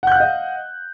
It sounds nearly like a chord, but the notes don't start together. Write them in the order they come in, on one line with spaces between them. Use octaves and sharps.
F#5 G6 F#6 F5 D#5